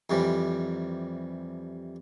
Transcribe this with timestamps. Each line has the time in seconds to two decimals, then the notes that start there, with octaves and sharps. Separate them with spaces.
0.10 F2 C3 E3 G3